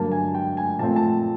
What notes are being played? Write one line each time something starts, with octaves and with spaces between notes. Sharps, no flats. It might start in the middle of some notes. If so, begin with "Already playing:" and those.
Already playing: G2 D3 F#3 A#3 A5
G#5
G5
G#5
A#2 F3 A3 C4 A5
G#5
A5